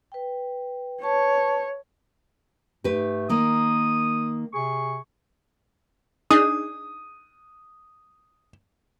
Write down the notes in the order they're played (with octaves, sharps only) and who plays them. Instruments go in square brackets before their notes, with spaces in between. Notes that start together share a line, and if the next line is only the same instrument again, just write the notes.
[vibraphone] B4 G5
[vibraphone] B4 A5 C#6 [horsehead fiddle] C#5
[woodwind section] G#2 A3 [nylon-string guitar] G4 B4
[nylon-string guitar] D#3 A#3 [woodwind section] D#6
[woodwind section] C3 G#4 C#6
[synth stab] D4 D#4 G#4 [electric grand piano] D#6